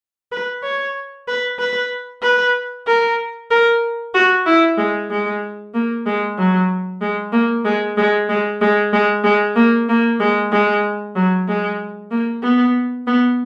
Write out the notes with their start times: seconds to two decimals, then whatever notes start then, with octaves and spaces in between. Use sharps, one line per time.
0.32 B4
0.63 C#5
1.28 B4
1.59 B4
2.23 B4
2.87 A#4
3.51 A#4
4.14 F#4
4.46 E4
4.78 G#3
5.10 G#3
5.74 A#3
6.06 G#3
6.38 F#3
7.01 G#3
7.32 A#3
7.65 G#3
7.97 G#3
8.29 G#3
8.61 G#3
8.93 G#3
9.24 G#3
9.56 A#3
9.89 A#3
10.20 G#3
10.52 G#3
11.16 F#3
11.48 G#3
12.11 A#3
12.43 B3
13.07 B3